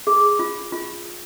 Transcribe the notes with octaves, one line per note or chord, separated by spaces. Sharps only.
G#4
F4
F4